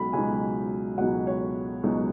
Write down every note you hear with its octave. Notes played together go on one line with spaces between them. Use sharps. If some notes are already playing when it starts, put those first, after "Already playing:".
Already playing: C#2 B2 F#3 D#4 B5
C#2 B2 F#3 D#4 G#5
C#2 B2 F#3 D#4 F#5
C#5
C#2 B2 F#3 D#4